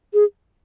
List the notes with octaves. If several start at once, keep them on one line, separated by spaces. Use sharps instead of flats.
G#4